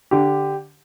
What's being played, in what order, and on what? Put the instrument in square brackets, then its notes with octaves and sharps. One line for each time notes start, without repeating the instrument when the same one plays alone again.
[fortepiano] D3 [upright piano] G4